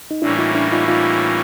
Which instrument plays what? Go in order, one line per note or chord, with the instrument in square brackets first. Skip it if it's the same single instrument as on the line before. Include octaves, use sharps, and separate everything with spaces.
[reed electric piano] D#4
[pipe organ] A2 E3 G3 A#3 C#4 [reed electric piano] D4 E4
[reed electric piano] D#4 F4
D4 E4
D#4 F4
D#4 F4